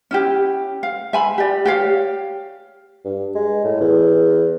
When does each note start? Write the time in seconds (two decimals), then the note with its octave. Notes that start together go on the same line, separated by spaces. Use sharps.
0.11 C#4 E4 G4
0.83 F5
1.13 E5 G#5 B5
1.38 G4 D5
1.65 G4 C#5 F5
3.05 G2
3.35 G#3
3.65 A2
3.81 E2